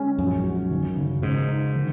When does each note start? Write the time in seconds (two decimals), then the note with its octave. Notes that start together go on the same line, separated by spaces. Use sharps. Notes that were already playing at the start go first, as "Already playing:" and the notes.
Already playing: G#3 C#4
0.18 A#1 F#2
0.44 F#4
0.70 D#2
0.97 C#3
1.22 G#2 C#3
1.48 D#4
1.75 D#3